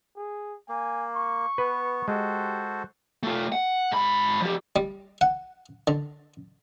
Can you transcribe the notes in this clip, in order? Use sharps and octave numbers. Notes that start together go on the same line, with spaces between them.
G#4
A#3 G#5
C#6
B3 B4
G#3 F#4 G4 A4 C5
A3 F4
F#5
G#2 B5
F3 G4
G3
F#5
D3